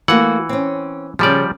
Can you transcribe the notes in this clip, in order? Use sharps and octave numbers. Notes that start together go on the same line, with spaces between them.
E3 A3 A#3 F#4 F#5
C4 C#4
C#3 F3 G3 G#4 D5